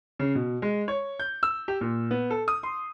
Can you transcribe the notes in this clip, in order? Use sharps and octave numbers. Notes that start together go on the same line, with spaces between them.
C#3
B2
G#3
C#5
G6
E6
G4
A#2
B3
A4
D#6
C6